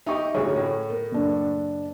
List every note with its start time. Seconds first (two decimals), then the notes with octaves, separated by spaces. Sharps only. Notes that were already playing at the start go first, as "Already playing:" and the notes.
0.06 D#4 G4 D#5 E5 C#6
0.34 A1 D2 G#4 C#5 C#6
0.56 A2
0.90 A#4
1.11 F#1 D4